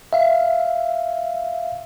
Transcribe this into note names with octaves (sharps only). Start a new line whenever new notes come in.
E5 F5